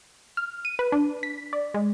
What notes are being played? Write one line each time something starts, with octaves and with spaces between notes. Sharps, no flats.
F6
D#7
B4
D4
B6
D5
G#3